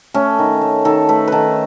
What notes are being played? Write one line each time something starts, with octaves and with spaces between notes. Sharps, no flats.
A3 C#4
D#3
A3
D#3 A4
A3 B4
D#3 A4 B4